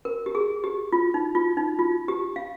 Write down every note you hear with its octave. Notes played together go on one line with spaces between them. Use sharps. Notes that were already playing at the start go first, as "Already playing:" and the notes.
A#4
G4
G#4
G4
F4
D#4
F4
D#4
F4
G4
F5